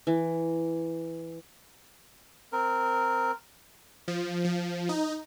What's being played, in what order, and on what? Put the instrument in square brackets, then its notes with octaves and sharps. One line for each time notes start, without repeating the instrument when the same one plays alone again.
[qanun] E3
[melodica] C4 A#4
[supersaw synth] F3
F3
D#4